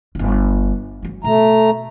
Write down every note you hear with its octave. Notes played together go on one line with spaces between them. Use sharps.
D1 G1
E3 F#3
B2 A3 A#5